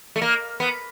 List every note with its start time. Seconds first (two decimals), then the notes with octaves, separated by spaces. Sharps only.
0.16 A3
0.22 A#3
0.60 B3